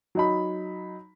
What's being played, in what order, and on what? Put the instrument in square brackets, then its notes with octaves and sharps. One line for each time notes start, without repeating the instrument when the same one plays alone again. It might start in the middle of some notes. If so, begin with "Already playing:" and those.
[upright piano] F#3 D#4 B5